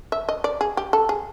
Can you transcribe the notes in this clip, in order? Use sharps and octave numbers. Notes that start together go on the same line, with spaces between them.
E5
D#5
D5
G#4
G4
A4
G#4